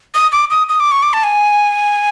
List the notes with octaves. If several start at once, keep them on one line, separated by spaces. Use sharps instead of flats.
D#6
D6
D#6
D#6
D6
C#6
D6
A5
G#5